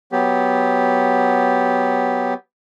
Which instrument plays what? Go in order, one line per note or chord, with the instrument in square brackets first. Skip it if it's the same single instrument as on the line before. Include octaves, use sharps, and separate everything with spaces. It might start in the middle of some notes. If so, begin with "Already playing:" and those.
[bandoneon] F#3 B3 G4